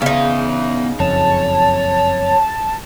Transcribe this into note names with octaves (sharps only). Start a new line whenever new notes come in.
C#3 B3 D#4 E5
F#1 F2 C#5 A5